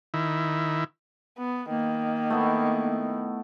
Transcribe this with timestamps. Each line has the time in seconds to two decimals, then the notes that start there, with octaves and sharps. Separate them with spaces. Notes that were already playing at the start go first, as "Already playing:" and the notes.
0.14 D#3 E4
1.38 B3
1.70 D#3 A#3
2.30 A3 B3 E4